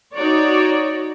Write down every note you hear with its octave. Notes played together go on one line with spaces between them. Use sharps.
D#4 F#4 C#5 D5